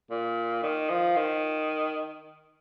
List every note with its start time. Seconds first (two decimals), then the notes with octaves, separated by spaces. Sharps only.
0.10 A#2
0.62 D#3
0.90 F3
1.16 D#3